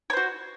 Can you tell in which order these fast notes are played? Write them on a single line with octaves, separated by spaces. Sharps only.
C#5 C5 F#4